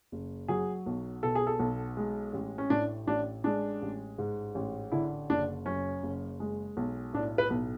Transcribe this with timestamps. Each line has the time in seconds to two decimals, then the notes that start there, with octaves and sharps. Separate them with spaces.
0.12 F#1
0.48 F#3 G#4
0.86 B1
1.23 B2 A4
1.35 G#4
1.47 A4
1.60 B1
1.97 G#3
2.33 A1
2.58 C#4
2.70 A2 D4
3.07 A1 D4
3.44 G#3 D4
3.82 A1
4.18 G#2
4.55 A1
4.92 D3 E4
5.30 F#1 D4
5.66 F#2 C#4
6.03 F#1
6.40 G#3
6.77 B1
7.14 A2 D4
7.38 B4
7.50 B1